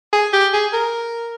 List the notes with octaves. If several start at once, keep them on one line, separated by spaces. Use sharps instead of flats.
G#4
G4
G#4
A#4